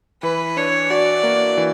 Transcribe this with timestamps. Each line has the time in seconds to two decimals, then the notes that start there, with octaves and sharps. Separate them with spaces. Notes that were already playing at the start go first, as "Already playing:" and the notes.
0.22 E3 B4
0.57 D4 C#5
0.90 F#4 D5
1.23 A#3
1.57 E3